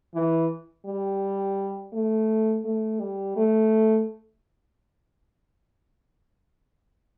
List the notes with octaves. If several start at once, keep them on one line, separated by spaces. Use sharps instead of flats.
E3
G3
A3
A3
G3
A3